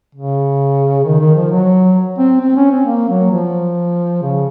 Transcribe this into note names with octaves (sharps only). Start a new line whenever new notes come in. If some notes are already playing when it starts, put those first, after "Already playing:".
C#3
D#3
D#3
F3
F#3
C4
C4
C#4
C4
A#3
F#3
F3
C#3